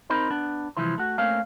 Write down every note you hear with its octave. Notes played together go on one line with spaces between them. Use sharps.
C4 D#4 A#4 C5 B5
B3 D4
C2 G2 E3 F3 E4 C5
A3 F#4
A3 A#3 C4 C#4 F5